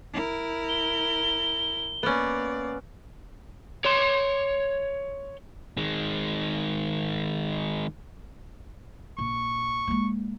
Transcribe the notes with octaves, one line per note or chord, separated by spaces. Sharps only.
E4 A#4
G7
A#3 B3 C#4 D5
C#5 C6
D#3 G#3
A#1 C#6
G#3 A#3